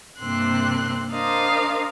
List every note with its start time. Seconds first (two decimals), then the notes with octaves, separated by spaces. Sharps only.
0.19 G2 C3 A#3 C4 C6 F#6
1.10 D4 A#4 C5 D#5 F5 A#5